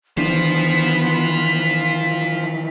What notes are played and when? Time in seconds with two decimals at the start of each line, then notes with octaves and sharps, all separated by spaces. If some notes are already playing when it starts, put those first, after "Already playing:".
0.17 D#3 E3 B3 D4 F4 C5 B6